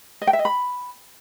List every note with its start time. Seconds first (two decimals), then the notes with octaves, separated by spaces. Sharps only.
0.22 D#5
0.27 G5
0.33 E5
0.39 D#5
0.45 B5